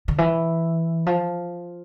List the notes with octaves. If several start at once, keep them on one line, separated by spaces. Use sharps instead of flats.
D3
E3
F3